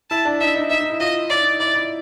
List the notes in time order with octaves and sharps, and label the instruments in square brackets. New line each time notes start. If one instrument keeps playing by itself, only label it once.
[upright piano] E4 [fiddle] A5
[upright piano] D4
[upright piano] D#4 [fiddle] E5
[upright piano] D#4
[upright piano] D#4 [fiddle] E5
[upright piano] D#4
E4
[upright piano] F4 [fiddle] D#5
[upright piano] E4 [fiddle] D5
[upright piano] D#4
D#4
[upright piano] E4 [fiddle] D5
[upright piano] E4